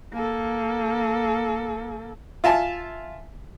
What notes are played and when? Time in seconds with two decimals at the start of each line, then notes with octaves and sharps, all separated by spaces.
0.13 A#3 A4
2.44 F4 E5 G#5 A5